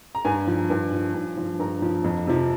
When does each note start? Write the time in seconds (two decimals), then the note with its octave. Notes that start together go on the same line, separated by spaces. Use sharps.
0.15 A#5
0.25 G2 G#5
0.47 F3
0.70 G2
0.93 F3
1.14 G2
1.38 F3
1.59 G2 A#5
1.82 F3
2.04 F2
2.27 C3 F3